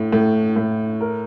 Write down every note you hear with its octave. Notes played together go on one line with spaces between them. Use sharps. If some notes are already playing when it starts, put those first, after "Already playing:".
Already playing: A2
A2
A2
A#4